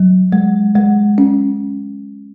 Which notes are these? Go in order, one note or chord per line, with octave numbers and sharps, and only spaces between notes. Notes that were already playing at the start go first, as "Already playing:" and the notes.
Already playing: F#3
G#3
G#3
C#4